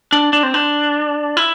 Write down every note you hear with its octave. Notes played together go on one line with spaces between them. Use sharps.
D4
D4
C4
D4
E4